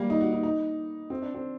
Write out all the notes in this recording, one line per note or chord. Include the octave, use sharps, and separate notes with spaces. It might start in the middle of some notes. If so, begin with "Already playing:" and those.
Already playing: G3 A#3
D#4
F#4
D#4
D#4
C4
D4
C4